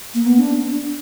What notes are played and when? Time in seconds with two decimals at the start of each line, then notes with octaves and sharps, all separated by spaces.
0.14 A#3
0.26 B3
0.39 D4